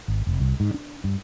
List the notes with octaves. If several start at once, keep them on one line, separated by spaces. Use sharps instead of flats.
G#1
F1
C2
G#2
D4
G2